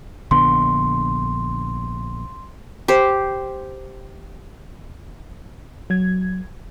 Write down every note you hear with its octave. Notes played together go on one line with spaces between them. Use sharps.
A#1 D3 B3 C6
G4 C5
F#3 G#6